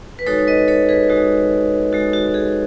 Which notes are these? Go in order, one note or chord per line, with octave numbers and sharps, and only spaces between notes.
B4
G#3 D#4 F#4 A4 C#5
C#5
B4 D#5
A4 C#5
G#4 B4
G#3 D#4 F#4
G#3 D#4 F#4 A4
F#4
G#4